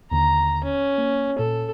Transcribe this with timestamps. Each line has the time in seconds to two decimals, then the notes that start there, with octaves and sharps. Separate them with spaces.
0.11 D#2 D3 A#5
0.64 C#4
0.98 A#3
1.39 A#2 A4